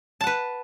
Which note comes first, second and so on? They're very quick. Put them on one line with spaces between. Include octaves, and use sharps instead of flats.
A5 F#5 B4